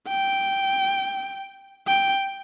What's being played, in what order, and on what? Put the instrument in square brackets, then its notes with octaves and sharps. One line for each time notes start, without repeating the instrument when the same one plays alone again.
[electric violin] G5
G5